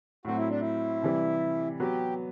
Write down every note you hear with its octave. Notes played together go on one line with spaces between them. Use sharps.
A2 F#3 C4 F#4
E4
D4
E4
C3 E3 G3
F#3 B3 F#4 G4 B4